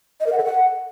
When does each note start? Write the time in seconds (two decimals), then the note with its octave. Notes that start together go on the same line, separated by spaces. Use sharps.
0.20 D#5
0.26 A#4
0.32 F#5
0.38 A4
0.44 F#5